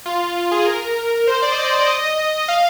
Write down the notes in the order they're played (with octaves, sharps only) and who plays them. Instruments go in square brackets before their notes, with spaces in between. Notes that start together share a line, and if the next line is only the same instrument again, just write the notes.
[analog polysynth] F4
G#4
A#4
C5
D5
D#5
D5
D#5
F5